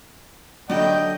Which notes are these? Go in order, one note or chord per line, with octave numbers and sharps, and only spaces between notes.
D3 F#3 G3 A3 D#5 G5